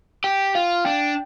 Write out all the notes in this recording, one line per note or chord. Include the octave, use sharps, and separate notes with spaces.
G4 G5
F4 F5
D4 G5